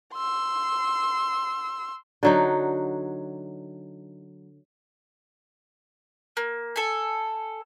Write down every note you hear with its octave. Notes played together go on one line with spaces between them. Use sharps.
C6 E6
D3 F#3 D#4
A#3
A4 G#5